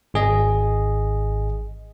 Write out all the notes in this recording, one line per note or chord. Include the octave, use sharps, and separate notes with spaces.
G#1 G#4 D#5